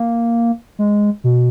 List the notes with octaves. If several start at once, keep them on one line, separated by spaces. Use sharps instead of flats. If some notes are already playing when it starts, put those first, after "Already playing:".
Already playing: A#3
G#3
B2